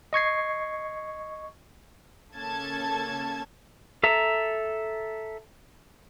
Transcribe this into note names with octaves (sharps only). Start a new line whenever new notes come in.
D#5 C#6 G#6 C7
C#3 A#3 C#4 A4 A5 G#6
A4 E5 A#5